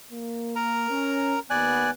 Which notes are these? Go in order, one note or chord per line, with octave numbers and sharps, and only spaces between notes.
A#3
A#4 A#5
C#4
D#2 B3 D5 G#5 F#6